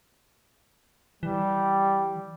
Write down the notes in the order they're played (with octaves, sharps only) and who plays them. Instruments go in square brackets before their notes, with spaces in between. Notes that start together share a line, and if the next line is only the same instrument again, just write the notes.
[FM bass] E3 [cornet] G3